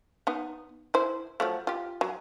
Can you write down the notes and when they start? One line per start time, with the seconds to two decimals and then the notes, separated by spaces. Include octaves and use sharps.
0.27 B3 D#4
0.94 E4 C5
1.40 F3 F#3 A3
1.67 F4 G4
2.01 F#3